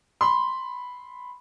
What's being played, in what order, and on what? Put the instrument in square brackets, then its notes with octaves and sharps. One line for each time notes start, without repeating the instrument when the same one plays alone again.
[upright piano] B5 C6